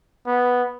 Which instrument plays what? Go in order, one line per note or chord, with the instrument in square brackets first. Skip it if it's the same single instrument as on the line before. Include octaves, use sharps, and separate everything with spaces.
[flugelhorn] B3